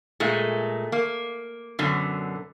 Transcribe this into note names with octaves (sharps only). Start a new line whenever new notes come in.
A#2 G#3 A3
A#3
F#2 B2 D3